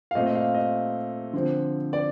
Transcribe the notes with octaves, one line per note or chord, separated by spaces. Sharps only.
F5
A#2 A3 C4 D#5
D#5
F5
D#5
D3 F3 C4
D5